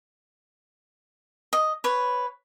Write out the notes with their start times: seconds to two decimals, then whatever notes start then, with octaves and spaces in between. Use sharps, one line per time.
1.53 D#5
1.84 B4 C#5